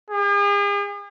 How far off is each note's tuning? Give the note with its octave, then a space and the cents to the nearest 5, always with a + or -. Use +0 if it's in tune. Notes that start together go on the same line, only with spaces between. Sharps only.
G#4 -45